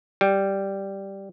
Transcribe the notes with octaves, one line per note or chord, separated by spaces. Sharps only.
G3